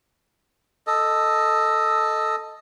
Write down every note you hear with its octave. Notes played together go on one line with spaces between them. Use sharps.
A4 D#5